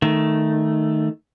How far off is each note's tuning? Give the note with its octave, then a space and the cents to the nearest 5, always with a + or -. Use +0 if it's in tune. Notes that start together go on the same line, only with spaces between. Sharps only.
D#3 +0 A3 +0